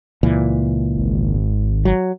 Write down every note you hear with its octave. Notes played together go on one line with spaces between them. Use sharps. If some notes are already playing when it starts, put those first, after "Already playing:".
C#2 A#2 E3
G#1
F#3